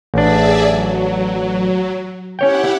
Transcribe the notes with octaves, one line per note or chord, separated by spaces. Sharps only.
A1 D4 G#4 D5 E5
F#3
C#4 E4 G4 C#5 F#5 G5